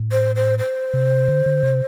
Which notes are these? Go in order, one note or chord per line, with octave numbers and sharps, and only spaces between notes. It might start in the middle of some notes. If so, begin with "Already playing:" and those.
Already playing: A2
C5
C5
C5
C3
D3
D3
C3